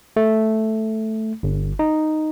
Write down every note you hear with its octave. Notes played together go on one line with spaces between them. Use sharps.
A3
G1
D#4